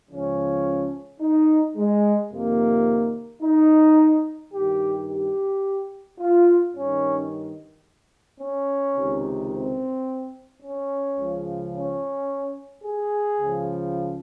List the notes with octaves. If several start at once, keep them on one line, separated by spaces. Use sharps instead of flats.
C#2 C#3 F3 C#4
D#4
G#3
F2 C3 D#3 A#3
D#4
G2 D#3 G4
G4
F4
G2 D#3 C#4
C#4
C#2 C3 D#3
C4
C#4
C#2 C#3 F3
C#4
G#4
C#2 C#3 F3